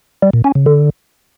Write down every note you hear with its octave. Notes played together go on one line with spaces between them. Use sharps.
G3
A#2
C#4
C#3
D3